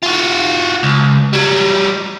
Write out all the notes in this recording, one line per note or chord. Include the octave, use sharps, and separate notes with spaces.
F4 F#4
C#2
F#3 G3